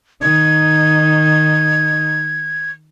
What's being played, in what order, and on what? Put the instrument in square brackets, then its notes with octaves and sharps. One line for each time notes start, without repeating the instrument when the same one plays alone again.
[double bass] D#3 D#4 [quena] G#6